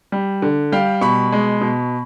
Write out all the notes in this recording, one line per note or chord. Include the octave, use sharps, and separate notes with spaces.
G3
D3
G3 F5 G5
B2 B5 C#6
G#3
B2